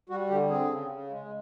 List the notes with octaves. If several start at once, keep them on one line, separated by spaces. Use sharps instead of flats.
G3 F#4
D3 G4
C4 G#4
C#3
C#3
G#3